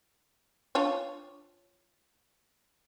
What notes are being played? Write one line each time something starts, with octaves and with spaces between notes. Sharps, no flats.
D4 F4 C#5